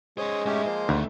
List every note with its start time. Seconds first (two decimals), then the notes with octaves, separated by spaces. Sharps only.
0.18 G#3 C#4 C5 C#5 D#6
0.46 G#2 A3 C#4 E4 G4
0.66 F3 A#3 F4 C5
0.89 D2 D#3 A3